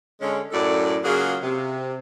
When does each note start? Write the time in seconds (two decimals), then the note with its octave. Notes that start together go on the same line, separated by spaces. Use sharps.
0.21 D3 G#3 C#4
0.52 F#2 A2 A4 D5
1.04 C#3 F#3 A#3 F4 F#4 G#4
1.43 C3